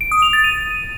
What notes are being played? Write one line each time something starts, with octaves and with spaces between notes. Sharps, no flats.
D7
D#6
F7
A6
D#7